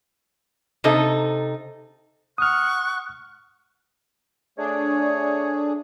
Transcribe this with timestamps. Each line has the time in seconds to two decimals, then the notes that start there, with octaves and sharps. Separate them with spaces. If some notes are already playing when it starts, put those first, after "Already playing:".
0.84 C3 D#4 A4
2.38 F#5 C#6 D#6 F6 F#6
4.58 A3 D4 G#4 C#5